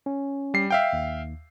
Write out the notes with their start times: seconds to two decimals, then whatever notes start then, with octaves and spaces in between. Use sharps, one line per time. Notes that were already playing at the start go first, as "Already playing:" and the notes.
0.06 C#4
0.54 G3 C7
0.70 E5 F5 G5
0.93 D#2